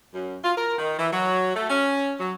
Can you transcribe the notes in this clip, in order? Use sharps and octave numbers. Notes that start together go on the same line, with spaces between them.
F#2
F4
A#4
D#3
E3
F#3
A3
C#4
F#3